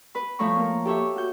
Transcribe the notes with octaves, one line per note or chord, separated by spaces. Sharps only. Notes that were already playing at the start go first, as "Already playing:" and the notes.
B4 B5
F3 A3 C#5 A#5 C#6
A#3 A#4
G4 A4 C#5 E5
F#4 G6